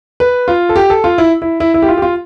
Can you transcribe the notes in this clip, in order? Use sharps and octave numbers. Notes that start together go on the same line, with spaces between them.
B4
F4
A4
G4
A4
F4
E4
E4
E4
E4
G4
F4
G4
F4